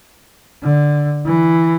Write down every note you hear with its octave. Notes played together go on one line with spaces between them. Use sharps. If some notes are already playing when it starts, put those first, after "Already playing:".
D3
E3